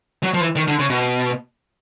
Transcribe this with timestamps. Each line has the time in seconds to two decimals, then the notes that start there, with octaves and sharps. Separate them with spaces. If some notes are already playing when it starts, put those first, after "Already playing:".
0.23 F#3
0.34 F3
0.41 E3
0.56 D#3
0.68 D3
0.79 C#3
0.90 B2